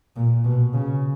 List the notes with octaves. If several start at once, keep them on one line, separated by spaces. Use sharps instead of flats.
A#2
B2
C#3